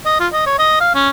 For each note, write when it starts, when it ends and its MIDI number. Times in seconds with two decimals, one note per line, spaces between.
0.06 0.20 75
0.20 0.28 65
0.33 0.46 75
0.46 0.54 73
0.59 0.80 75
0.81 0.93 77
0.95 1.10 61